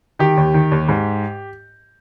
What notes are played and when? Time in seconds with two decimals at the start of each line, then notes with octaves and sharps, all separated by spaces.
0.19 D#3 G4
0.37 D#2
0.54 D#3
0.72 D#2
0.88 G#2